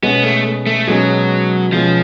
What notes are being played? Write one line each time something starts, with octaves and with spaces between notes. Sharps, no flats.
B2 G#3 B3 C#4 G#4
A3
A3
B2 F#3 G#3 C#4 G#4
B2 F3 G#3 C#4 G#4